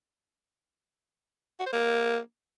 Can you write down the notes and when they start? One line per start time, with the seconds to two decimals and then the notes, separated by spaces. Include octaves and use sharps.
1.59 F#4
1.66 C5
1.73 A#3